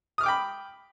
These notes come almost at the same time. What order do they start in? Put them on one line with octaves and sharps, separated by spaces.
D#6 F6 D6 G5 B5